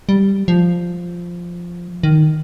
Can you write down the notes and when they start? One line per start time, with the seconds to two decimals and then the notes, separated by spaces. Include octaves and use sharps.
0.09 G3
0.48 F3
2.03 D#3